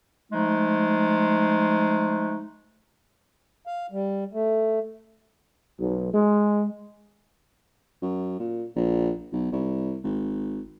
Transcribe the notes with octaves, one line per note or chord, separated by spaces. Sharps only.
F3 G#3 A3 D#4
F5
G3
A3
B1
G#3
F#2
A#2
A#1
B1
C2
G#1